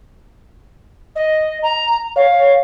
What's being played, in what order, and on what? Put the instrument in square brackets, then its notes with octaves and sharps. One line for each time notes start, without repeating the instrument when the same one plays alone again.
[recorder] D#5
A#5
[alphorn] C#5 [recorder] F5